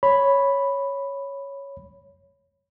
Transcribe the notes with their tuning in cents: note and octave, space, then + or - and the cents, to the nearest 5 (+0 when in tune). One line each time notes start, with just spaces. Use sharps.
C#5 +0 B5 +0